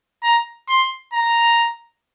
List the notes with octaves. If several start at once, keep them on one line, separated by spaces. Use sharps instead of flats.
A#5
C6
A#5